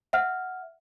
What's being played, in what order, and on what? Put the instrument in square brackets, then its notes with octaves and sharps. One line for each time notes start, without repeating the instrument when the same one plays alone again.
[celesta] E5 F#5 F6